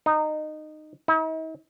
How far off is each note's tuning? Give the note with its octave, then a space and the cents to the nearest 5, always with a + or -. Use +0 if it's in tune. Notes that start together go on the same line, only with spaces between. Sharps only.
D#4 -20
D#4 +45